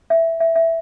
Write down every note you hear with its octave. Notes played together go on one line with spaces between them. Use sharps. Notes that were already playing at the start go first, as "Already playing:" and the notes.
E5
E5
E5